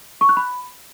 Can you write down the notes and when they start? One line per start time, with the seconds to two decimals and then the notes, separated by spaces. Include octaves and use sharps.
0.21 C#6
0.29 F#6
0.37 B5